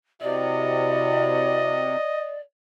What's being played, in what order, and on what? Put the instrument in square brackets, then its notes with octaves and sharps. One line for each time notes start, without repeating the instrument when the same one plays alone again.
[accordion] C3 [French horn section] C4 E4 F#4 [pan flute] D5 [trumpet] D#5